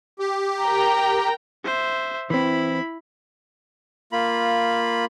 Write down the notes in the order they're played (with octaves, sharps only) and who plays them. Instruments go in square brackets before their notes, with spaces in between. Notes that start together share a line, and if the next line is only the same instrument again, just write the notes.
[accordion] G4
[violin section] A#4 G5 A#5
[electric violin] C5 E5
[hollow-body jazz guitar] E3 C4 [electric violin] E4 B5
[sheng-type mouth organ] A#3 F4 B5